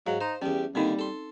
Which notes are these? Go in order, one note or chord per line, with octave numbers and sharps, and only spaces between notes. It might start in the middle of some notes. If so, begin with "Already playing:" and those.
G#2 F#3 F5
D#4 C5
E2 G3 C#4 G4
A#2 D3 D#3 G3 C4 D#4
A4 C6